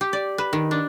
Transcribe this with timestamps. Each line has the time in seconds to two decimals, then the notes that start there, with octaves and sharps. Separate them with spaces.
0.01 G4
0.13 D5
0.38 B4
0.53 D#3
0.71 D4